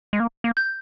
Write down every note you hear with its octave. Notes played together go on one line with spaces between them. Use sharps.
G#3
A#3
A#3
G6